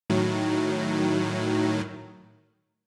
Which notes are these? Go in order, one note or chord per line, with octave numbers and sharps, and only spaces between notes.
A2 D#3 F#3